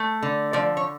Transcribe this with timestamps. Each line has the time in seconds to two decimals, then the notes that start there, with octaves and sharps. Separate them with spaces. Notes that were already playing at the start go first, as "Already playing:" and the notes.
Already playing: A3
0.23 D3
0.53 F3 D5
0.77 C#5